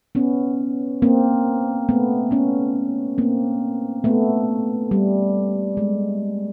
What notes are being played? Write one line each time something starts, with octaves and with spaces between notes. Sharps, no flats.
B3 C#4
A#3 C4
A3 B3
B3 C#4
A#3 C4
A3 B3
G3
G#3